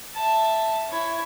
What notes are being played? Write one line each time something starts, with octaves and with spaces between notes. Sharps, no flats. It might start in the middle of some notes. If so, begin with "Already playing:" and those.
E5 A5
E4 C#5